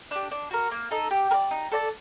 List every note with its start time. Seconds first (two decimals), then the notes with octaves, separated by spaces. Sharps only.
0.11 D4 G4
0.31 D4
0.51 F#4 A#4
0.71 A#3
0.91 D#4 A4
1.11 G4
1.31 A#4
1.34 D5
1.51 D#4
1.72 A4 D5 A5